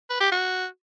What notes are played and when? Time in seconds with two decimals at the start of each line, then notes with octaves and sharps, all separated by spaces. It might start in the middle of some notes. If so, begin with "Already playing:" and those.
0.10 B4
0.21 G4
0.32 F#4